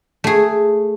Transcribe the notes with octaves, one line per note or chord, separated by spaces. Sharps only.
A3 G#4